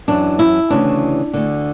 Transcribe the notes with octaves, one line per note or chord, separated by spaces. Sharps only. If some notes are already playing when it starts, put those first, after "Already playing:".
F#2 E3 D4
E4
D2 C#3 E3 D4
D2 D3